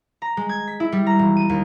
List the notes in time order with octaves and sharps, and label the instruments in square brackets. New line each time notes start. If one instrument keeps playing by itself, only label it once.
[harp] A#5
G#3
G#6
B6
E4
G3
A#5
E1
D#7
D#2